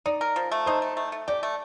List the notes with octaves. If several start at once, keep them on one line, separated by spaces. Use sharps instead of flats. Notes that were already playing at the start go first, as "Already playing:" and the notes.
D#4 D5
A#4
F3
A3
D#4 C5
A3
A3
A3
G4 D5
A3